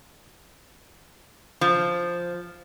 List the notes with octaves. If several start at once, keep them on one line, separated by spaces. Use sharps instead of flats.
F3